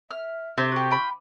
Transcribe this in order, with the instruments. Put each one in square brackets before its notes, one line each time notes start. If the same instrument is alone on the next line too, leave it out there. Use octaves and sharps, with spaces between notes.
[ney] E5 [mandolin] F6
[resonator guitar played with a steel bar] C3 [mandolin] C5
[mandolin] F#4 G4 [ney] C#6
[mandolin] F4 G5 B5